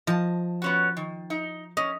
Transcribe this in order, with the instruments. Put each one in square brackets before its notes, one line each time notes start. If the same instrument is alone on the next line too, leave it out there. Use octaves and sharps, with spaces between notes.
[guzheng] F3 [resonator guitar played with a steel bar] D#5 A5
[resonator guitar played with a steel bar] B3 C#4 F#4
D#3
D#4
[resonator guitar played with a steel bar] C#4 [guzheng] D#5